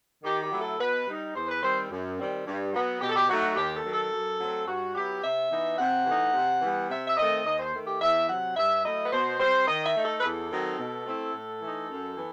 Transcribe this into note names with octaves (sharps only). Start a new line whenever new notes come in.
D#3 G4
G4
F#3 A3 E4
A4
B2 B4
G3 D#4
E2 C5
B4
D#3 G3 C4 C5
F#2
D#3 G3 C4
G2
F#3 B3
B2 G4
A4
G4
F#3 A3 D#4 F#4
D#2 G4
A4
D#3 F#3
A4
F#2
F#3 A3 C4
G2 F#4
F#3 B3 E4 G4
C3 E5
E3 B3 D#4
C3 F#5
E3 A3 D#4
C3
E3 G3 B3
C3 E5
E5
D#3 A3 C4 D#5
D#2 D#5
C5
D#3 A3
G4
E2 E5
C3 F#3 F#5
G2 E5
F#3 A3 E4 D#5
B4
B2 C5
G3 C4 C5
D#3 D#5
E5
A3 D#4
A4
B4
E2 A4
D#3 F#3 C4 D#4
B2
A3 C4 E4
A2
E3 A3 D#4
F#2
E3 B3